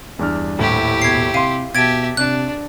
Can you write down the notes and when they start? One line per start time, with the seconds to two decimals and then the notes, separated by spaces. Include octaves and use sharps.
0.19 E2 G2 D4 F6
0.59 D#1 A2 E4 G4
1.02 B2 G#6 C7
1.34 C3 F5 C6 D#7
1.75 B2 G4 E5 A5 G#6 A6 D7
2.17 C3 D4 F#6